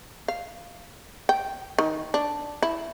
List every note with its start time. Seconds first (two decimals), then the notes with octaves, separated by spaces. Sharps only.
0.28 F5
1.29 G5
1.78 D#3
2.14 D4
2.62 E4